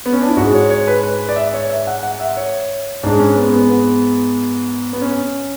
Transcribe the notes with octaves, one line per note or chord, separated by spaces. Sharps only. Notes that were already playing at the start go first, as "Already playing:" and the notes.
B3
C#4
D4
E4
G#2 G#3 F#4
C#5
C#5
B4
B4
D5
E5
C#5
E5
F#5
F#5
E5
C#5
G#2 G#3 D4
C#4
B3
B3
B3
B3
C#4